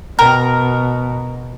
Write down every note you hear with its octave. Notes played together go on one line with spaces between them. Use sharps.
B2 A#4